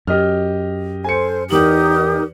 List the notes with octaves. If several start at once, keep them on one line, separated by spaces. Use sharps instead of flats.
F#2 G4 D#5 F6
A4 C5 G#5 C#7
E2 D#4 G4 A#4 D#6 F#7